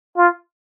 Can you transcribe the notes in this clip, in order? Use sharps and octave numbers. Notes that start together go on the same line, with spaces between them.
F4